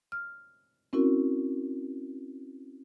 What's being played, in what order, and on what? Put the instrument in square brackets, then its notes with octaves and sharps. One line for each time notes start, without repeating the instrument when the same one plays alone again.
[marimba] F6
C4 C#4 E4 F#4 A#4